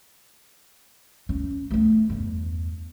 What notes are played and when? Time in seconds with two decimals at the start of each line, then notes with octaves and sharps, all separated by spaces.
1.29 C#4
1.71 A3 B3
2.10 E2 G2